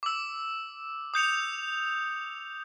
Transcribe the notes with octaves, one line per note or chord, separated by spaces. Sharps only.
D6 E6
D#6 G6 C#7 F7